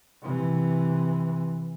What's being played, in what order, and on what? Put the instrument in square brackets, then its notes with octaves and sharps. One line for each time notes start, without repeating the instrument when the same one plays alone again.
[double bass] C3 E3